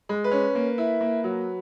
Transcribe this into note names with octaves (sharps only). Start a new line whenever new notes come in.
G#3
B4
C#4
A#3
E4
A#3
F#3